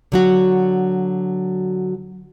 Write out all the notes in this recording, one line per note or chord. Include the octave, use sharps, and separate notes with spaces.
D3 F#3 F#4